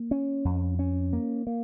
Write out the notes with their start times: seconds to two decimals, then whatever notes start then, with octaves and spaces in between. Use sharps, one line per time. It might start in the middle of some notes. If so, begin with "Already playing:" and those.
Already playing: A#3
0.11 C#4
0.45 F2
0.79 C#4
1.13 A#3
1.47 A#3